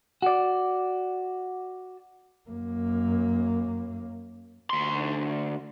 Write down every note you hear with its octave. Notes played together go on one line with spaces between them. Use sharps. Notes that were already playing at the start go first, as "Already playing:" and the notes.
F#4 D5
F#2 A#3
D2 C6